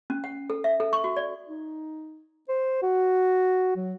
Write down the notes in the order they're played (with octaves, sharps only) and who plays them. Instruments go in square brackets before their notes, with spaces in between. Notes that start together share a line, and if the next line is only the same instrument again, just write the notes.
[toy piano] C#4
F#5
A4
E5
A4
C#6
F#4
D5
[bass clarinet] D#4
C5
F#4
F#3